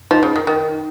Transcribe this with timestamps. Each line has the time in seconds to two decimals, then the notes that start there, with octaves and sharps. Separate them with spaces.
0.11 F3 D#4
0.23 C#3
0.36 D#3
0.47 D#3